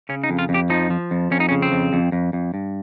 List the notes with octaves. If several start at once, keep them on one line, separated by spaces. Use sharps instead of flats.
C#3 C#4
D#4
F2
F4
F2
G4
F3 D#4
F3
F2
F2 C#4
D#4
C#3 C#4
C4
F2
F2
F2
F2
G2